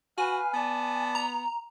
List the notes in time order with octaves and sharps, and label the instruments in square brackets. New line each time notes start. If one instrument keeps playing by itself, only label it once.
[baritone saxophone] F#4 [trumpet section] B4 F5 [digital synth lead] G#5
[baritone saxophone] B3 [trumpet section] D5 A5
[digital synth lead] A#5